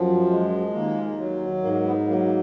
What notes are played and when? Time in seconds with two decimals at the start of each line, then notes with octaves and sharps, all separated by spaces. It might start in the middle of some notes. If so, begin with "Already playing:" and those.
Already playing: F#2 F3
0.29 G#3
0.73 D#2 A#3
1.18 F#3
1.62 G#2 A#3
1.85 B3
2.07 F#3 A#3
2.25 A#3